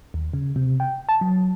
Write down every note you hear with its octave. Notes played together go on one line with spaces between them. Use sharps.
D#2
C#3
C3
G5
A5
F#3